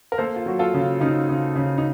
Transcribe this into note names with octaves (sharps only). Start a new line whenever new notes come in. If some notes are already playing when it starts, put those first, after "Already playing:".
A#4
A#3 A4 C5
F4
F#3 F#4
F4 A4
C#3
C#3 D#4
C#3
C#3
D#4